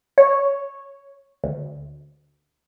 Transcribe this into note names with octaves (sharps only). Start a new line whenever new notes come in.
C#5
D2